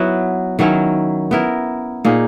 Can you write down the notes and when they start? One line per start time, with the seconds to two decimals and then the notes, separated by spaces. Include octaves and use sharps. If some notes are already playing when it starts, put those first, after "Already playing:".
Already playing: F#3 B3 E4 B4
0.59 D#3 F#3 C#4 E4
1.31 B3 E4 A#4
2.05 A#2 A#3 D#4 G#4